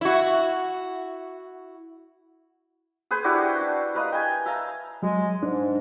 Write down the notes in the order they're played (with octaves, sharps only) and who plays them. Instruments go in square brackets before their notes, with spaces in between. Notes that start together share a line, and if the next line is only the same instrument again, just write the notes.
[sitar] E4 F#4
[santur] G#4 B4 C5
D4 E4 F#4 G4
D4
A#4 B4 D#5 F5
G5 G#5
E5 F5 A5 A#5
[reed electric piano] F#3 [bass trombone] G#3
[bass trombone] G#2 [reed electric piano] D4